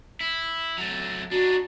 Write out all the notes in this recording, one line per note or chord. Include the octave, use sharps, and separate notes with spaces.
E4
F#3 A3
D4 D#4 F#4